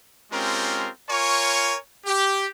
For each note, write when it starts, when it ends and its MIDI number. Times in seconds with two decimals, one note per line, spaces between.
0.33 0.88 56
0.33 0.88 60
0.33 0.88 61
0.33 0.88 65
0.33 0.88 67
0.33 0.88 70
1.10 1.76 65
1.10 1.76 70
1.10 1.76 73
1.10 1.76 80
1.10 1.76 85
2.06 2.47 67